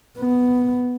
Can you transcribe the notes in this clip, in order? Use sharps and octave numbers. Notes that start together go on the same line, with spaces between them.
B3